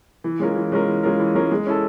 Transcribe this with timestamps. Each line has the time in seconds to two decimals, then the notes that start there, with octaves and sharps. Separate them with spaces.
0.24 E3
0.40 G#3 C#4 F4 A#4
0.56 E3
0.72 G#3 C#4 F4 A#4
0.88 E3
1.03 G#3 C#4 F4 A#4
1.19 E3
1.35 G#3 C#4 F4 A#4
1.52 G#3
1.66 C#4 E4 A4